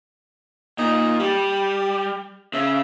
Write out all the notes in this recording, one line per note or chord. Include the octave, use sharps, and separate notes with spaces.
A#2 D#4
G3 G4
C#3 E5